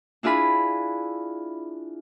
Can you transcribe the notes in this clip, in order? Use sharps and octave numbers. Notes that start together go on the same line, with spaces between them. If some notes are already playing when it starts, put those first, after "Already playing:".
D4 E4 F4 G#4 B5